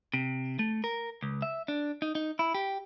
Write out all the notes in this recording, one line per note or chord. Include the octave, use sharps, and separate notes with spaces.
C3
A3
A#4
C#2
E5
D4
D#4
D#4
E4
G4